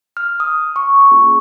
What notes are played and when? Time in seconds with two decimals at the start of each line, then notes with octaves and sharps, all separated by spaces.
0.17 F6
0.40 D#6
0.76 C#6
1.11 A#3 C#4 F4 G#4